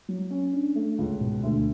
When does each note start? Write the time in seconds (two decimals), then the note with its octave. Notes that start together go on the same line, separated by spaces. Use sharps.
0.09 F#3
0.30 C#4
0.53 D4
0.76 A3
0.98 C#2
1.20 B2
1.43 D2